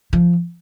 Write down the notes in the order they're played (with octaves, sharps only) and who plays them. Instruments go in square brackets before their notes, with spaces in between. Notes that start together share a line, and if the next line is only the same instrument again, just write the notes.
[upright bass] F3